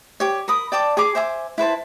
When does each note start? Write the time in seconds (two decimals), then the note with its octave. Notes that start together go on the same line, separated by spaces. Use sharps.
0.20 G4 C#5
0.48 A#4 B5 D#6
0.72 D5 G5 A5 D6
0.97 G#4 G#5 D6
1.15 C5 E5 G#5 D6
1.58 E4 B4 C5 A5